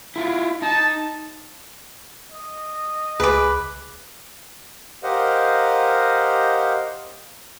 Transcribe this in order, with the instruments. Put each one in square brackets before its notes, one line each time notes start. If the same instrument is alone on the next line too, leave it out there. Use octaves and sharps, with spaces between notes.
[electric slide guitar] E4 F4
[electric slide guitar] D#4 [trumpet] A5
[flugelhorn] D#5
[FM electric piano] C#2 [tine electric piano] G#4 [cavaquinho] B4 D6
[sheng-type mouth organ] G4 A#4 C5 D#5 F5 F#5